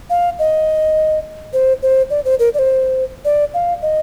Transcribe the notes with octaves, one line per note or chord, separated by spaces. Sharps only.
F5
D#5
C5
C5
D5
C5
A#4
D5
C5
D5
F5
D#5